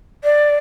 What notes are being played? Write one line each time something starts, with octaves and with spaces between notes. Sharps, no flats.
D5